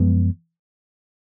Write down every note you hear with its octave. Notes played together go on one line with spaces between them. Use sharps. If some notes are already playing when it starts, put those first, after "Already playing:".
Already playing: F#2 F3 G#3 B3